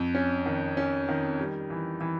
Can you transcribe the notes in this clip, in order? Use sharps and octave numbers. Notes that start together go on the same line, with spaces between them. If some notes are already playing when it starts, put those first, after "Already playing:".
Already playing: F2
C#4
D#3
C#4
D#3
G3
E3
E3